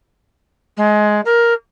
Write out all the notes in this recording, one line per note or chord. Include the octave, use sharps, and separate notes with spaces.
G#3
A#4